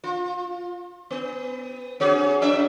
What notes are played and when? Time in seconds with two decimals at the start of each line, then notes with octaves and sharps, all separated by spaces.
0.04 F4
1.11 B3
2.00 C4 F#4 G#4
2.41 F#2 C#4 E5